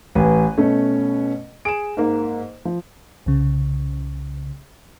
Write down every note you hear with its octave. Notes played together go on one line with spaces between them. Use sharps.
A1 B4 G#5
B2 A3 C#4
G#4 D7 E7
G#2 A#3
F3
C2 C#3